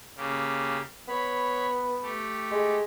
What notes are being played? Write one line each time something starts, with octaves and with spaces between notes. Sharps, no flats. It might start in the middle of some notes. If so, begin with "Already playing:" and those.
C#3 A#3 G4
B3 C#5 B5
A3 G4
G#3